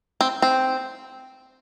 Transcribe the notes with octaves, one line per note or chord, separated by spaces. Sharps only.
C4
C4